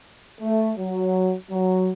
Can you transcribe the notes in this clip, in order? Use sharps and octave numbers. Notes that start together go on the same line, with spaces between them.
A3
F#3
F#3